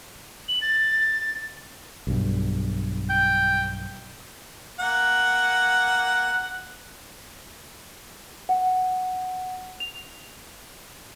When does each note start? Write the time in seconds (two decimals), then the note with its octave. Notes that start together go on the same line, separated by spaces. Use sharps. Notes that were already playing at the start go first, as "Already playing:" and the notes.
0.48 F#7
0.62 A6
2.07 B1 G2
3.10 G5
4.79 A#3 F#5
8.49 F#5
9.80 F7